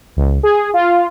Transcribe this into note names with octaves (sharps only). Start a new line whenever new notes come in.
C#2
G#4
F4